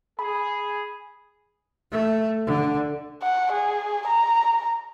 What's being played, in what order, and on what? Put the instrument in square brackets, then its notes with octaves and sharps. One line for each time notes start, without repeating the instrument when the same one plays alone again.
[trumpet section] G#4 [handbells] B5
[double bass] A3
D3
[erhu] F#5
G#4
A#5